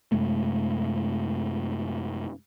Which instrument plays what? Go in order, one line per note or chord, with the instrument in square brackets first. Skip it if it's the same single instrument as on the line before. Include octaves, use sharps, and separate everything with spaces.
[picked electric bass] F#2 C3 G#3 A3